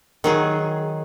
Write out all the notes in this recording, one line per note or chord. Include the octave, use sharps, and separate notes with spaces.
D#3 F#3 G#4